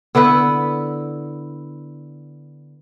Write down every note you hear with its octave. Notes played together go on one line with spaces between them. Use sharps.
D3 B3 E4 B4